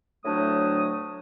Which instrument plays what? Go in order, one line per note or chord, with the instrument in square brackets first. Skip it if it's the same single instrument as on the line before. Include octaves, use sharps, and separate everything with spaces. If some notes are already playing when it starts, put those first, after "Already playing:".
[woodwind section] D2 A2 F#3 A3 D4 D#6